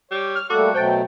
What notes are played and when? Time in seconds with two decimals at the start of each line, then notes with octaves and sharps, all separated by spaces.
0.11 G3 C#5
0.35 F6
0.50 G3 A3 A#3 F#4 A4 D6
0.74 B2 F#3 A3 C5 G5 A5 A6